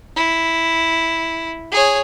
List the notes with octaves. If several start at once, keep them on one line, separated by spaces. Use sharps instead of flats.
E4
G#4 C#5